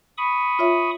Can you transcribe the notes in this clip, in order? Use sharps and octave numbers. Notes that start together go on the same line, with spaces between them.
B5 C#6 D#6
F4 C#5 E5